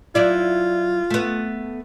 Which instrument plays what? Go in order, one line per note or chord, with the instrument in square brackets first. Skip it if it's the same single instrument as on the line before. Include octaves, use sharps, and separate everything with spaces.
[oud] F#3 E4 D5 [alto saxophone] F4
[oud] A3 B3